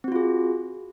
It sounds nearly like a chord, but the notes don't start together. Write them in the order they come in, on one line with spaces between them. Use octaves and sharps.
C4 F#4 F4 G#4